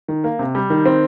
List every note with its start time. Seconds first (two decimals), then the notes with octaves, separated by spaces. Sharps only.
0.08 D#3
0.24 A#3
0.39 C3
0.55 G3
0.70 D#3
0.86 C4